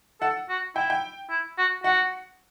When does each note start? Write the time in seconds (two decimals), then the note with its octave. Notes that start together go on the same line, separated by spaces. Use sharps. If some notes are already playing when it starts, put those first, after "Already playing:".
0.21 A4 F#5
0.49 F#4
0.76 E4 G5
0.90 G5
1.30 E4
1.58 F#4
1.84 F#4 F#5